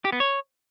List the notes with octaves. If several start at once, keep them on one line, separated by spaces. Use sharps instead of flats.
G4
B3
C#5